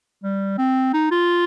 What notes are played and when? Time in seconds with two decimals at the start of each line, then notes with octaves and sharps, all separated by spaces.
0.23 G3
0.58 C4
0.93 D#4
1.11 F4